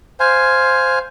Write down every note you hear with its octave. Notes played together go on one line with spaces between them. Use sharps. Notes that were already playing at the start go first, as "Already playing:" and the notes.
C5 F5 G#5